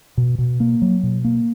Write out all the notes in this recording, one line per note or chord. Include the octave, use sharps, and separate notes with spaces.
B2
B2
A#3
F#3
B2
A#3